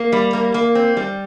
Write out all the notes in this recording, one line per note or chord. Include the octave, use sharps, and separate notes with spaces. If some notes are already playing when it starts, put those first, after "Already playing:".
Already playing: A#3
G3
A#3
A#3
C4
G3